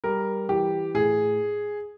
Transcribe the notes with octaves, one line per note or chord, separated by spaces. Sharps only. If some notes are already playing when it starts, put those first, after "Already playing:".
G3 A#4
E3 G4
A2 G#4